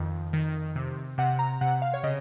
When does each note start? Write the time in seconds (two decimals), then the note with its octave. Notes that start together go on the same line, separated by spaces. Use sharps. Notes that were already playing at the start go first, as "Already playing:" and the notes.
Already playing: F2 D#3
0.33 D#3
0.76 C3
1.18 C3 F#5
1.39 A#5
1.61 C3 F#5
1.82 F5
1.94 C#5
2.03 C#3 D#5